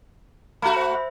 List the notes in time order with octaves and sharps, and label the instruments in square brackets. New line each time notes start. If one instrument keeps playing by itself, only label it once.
[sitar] A3 F#4 [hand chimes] B5 G6
[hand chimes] C5
E5